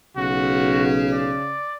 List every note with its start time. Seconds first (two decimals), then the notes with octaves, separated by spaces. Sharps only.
0.17 B1 C#3 F#4
1.12 D5